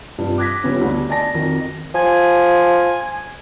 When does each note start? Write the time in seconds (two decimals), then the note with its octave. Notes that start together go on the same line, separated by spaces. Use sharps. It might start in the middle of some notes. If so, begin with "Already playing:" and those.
0.18 G2 C3 F3
0.38 D6 F#6 G#6 A#6 B6
0.64 C#3 F3 G3 B3 C#4
0.81 D2 D3 A3 B3 D4
1.10 D5 G#5 A5 A#6
1.34 F2 D#3 F#4
1.94 F3 G#5